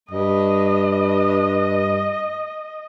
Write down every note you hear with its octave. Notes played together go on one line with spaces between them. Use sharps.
G2 D#5